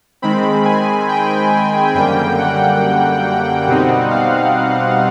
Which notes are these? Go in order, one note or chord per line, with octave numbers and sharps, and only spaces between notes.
D#3 G#3 C4 B5
G#5
G5
F#2 D3 G3 A#3 G5
F#5
B2 G3 C4 D#4
F5